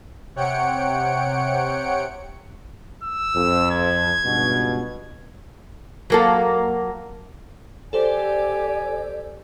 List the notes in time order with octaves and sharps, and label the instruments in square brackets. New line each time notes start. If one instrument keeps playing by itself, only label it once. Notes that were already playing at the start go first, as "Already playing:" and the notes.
[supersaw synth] C3 C#5 F#5 G5 C#7 D7
[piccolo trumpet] E6
[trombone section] F2
[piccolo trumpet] G#6
[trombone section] C#2 G2 B2
[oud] F#3 A#3 A4
[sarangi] G4 [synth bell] A4 C5 [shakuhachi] D5 [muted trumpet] G#5